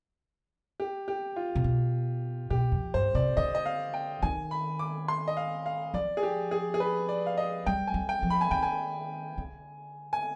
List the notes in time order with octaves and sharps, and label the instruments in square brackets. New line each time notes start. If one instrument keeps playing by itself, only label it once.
[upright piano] G4
G4
F4
[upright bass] C3
B2
[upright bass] B2 [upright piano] G4
[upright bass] F2
[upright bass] G2 [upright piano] C5
[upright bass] C3 [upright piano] D5
[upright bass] D3 [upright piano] D#5
[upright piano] D#5
F5
G5
[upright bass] D#3 [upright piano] G#5
[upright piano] B5
D6
C6
D#5
F5
F5
[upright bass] F3 [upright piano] D5
[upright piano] G#4
G4
G#4
G#4
B4
D5
F5
D#5
[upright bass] G3 [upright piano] G5
[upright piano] G#5
[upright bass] G3
[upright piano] G5
[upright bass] F3
[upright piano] B5
G#5
[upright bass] D#3 [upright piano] G5
[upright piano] G#5
[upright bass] D3
[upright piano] G#5